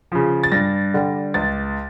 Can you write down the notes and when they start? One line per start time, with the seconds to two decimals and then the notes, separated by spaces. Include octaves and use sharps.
0.12 C#3 F3
0.44 A6
0.52 G2 A#6
0.94 D3 G3
1.34 C#2 A6